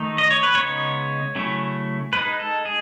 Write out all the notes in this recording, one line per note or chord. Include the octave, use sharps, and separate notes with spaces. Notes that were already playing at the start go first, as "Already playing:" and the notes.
Already playing: D#3 A3 D#4
D#5
C#5
B4
C#3 G#3 B3 D#4 C#5
C#3 F#3 A3 C#4 E4
G#3 D#4 B4
A4
G#4